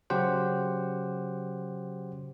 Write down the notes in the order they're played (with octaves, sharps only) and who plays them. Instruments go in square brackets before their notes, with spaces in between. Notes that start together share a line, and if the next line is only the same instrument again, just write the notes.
[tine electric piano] C#3 F#3 G4 C5 F#5